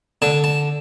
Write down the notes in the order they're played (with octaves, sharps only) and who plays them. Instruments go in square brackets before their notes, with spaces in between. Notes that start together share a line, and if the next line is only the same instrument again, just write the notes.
[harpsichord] D3 A5
A5